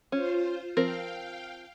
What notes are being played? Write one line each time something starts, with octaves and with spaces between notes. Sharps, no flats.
C#4 F4 C5
F3 C4 A#4 F5 G5